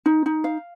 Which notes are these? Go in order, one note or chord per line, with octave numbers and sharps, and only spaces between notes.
D#4
D#4
F5